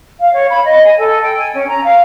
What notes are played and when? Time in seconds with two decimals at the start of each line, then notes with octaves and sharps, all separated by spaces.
0.20 F5
0.33 C#5
0.50 B5
0.66 D#5
0.84 G#5
0.99 A4
1.23 G5
1.37 G#5
1.53 C#4
1.69 A#5
1.84 F5